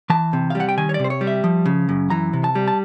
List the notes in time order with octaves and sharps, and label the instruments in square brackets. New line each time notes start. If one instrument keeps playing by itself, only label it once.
[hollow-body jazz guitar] E3 A5
C3
F5
G3
F#5
G5
D#3 G#5
C#5
D5
C3 C5
C#5
G3
E5
F3
C#3
F#2
E3 A#5
C3
A5
G3
A5